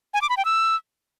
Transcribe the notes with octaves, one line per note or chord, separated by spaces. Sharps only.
G#5
D6
B5
G5
E6